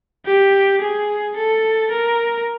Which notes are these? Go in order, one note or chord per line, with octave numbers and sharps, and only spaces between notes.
G4
G#4
A4
A#4